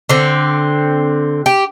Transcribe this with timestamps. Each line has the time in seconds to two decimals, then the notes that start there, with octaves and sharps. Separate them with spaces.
0.09 D3 C4
1.46 G4